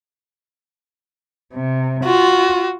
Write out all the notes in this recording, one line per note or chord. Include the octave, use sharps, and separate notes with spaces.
C3
F4 F#4